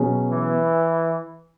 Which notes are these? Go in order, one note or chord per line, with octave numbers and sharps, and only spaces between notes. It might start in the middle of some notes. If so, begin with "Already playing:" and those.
Already playing: B2 F#3 C#4 G#4
E3